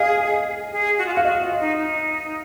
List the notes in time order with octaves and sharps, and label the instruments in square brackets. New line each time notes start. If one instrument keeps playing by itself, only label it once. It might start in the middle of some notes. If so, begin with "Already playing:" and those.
Already playing: [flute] G#4 [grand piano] D#5 F5
[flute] G#4
F#4
F4
F#4
[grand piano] F5
[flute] F#4 [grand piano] D#5
[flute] F4
D#4
D#4